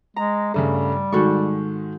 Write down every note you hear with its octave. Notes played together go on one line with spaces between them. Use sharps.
G#3 A#5
G2 C#3 G3 A3
G#2 D#3 G#3 F#4 A4 C#6